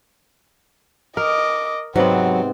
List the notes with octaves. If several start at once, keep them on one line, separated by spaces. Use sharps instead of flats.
A#4 D#5 D6
G#2 C3 F#3 B3 C4 C5